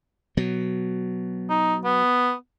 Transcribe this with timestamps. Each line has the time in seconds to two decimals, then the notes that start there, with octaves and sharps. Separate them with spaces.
0.37 B2 F#3
1.50 D#4
1.85 B3